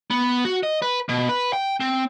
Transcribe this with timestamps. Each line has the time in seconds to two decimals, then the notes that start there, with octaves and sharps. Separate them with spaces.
0.11 B3
0.45 F#4
0.63 D#5
0.82 B4
1.09 B2
1.29 B4
1.53 G5
1.80 C4